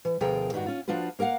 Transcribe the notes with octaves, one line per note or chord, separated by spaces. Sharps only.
E3
D2 B2 F3 G#4 A#4 G5
G2 D#3 D4 D#4 F#4
C#4 F4
F3 D4 F4 F#4 B4
A#3 A#4 D#5 F5 F#5